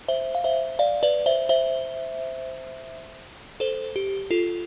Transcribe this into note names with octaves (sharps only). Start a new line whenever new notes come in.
C5 E5
F5
C5 E5
D5 F5
B4 D5
C5 E5
C5 E5
A4 C5
G4
F4 A4